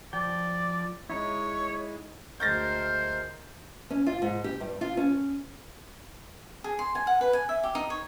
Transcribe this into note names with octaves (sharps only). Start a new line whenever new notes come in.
F3 D5 G5
G#3 D#4 E4 C#5
D2 G#3 A#4 C5 G6 A6 A#6
C#4
F4
G#2
G4
G2
F4
C#4
G#4
C6
G#5
F#5
B4
G#5
E5
G4
D#4
C#5